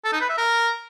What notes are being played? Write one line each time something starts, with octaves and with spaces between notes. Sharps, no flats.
A4
D#4
B4
E5
A#4